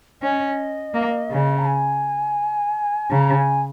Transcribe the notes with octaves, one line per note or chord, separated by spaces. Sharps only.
C#4 D#5
A#3
C#3
A#5
G#5
C#3 A#5
G#5